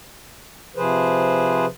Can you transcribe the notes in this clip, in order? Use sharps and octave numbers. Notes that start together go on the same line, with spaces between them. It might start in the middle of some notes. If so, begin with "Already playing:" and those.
C3 F3 G#4 B4 C5